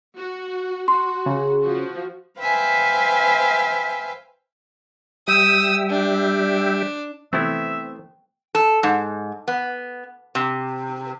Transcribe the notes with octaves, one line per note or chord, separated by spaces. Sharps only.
F#4
F#4 C6
C#3
F3 F#4
B4 C5 E5 F5 G5 G#5
G3 E5 G5 D#6 E6
D4
C3 E3 F3 A3 B3 C4 E4 E5
A4
G#2
B3
C3